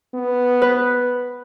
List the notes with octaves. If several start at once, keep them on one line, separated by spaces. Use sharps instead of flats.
B3
B4